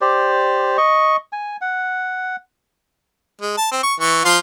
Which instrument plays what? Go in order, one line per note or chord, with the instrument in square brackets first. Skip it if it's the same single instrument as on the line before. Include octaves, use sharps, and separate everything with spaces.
[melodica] G4 C5 D5
D#5 C#6
G#5
F#5
[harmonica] G#3
A5
C4
C#6
E3 C#6
F3 F4 C6